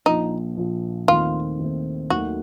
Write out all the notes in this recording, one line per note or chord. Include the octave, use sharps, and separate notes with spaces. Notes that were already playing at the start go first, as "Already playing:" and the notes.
A#1 A#2 F3 D#4
A#1 A#2 F3
D#2 D#3 A3 C4 F4
D#2 D#3 A3 C4
D#2 D#3 F#3 A3 F#4